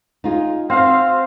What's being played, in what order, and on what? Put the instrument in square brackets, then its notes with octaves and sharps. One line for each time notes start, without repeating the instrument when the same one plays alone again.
[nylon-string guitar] D#4 F4 G#4
[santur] C4 [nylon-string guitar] F#4 C5 [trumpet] F5